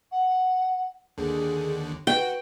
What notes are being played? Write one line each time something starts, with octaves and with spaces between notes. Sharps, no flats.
F#5
D#2 D3 G#4
F#4 B4 G5